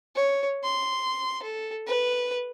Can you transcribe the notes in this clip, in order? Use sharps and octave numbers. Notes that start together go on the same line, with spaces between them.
C#5
C6
A4
B4